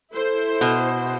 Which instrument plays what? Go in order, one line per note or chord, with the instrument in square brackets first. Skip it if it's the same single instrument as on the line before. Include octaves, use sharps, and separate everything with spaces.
[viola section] E4 C5 [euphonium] A4
[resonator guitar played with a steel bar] B2